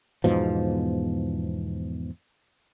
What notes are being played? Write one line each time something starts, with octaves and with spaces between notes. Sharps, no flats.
E2 G#2 B2 F3